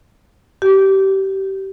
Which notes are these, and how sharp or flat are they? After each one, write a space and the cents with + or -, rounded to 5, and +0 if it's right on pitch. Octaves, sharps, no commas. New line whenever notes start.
G4 -25